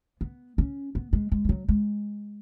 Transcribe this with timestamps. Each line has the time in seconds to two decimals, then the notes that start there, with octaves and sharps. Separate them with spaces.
0.21 B3
0.58 C#4
0.95 B3
1.13 G#3
1.32 G#3
1.45 E3
1.49 F#3
1.68 G#3